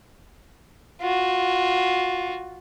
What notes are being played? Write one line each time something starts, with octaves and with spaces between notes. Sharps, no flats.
F4 F#4